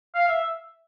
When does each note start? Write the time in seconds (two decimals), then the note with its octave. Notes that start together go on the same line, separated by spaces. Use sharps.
0.15 F5
0.28 E5